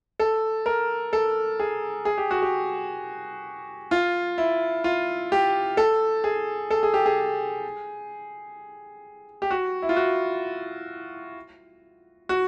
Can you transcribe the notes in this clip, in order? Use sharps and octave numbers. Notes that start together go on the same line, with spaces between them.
A4
A#4
A4
G#4
G#4
G4
F#4
G4
F4
E4
F4
G4
A4
G#4
A4
G#4
G4
G#4
G4
F#4
E4
F4
F#4
F#4